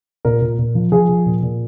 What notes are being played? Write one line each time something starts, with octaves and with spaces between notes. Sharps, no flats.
A#2 A#4
A#2
A#2
F3
F3 G#4
F3
A#2
A#2